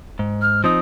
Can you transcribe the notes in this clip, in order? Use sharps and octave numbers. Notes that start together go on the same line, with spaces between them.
G#2
F6
F3 C4 D#4 D#6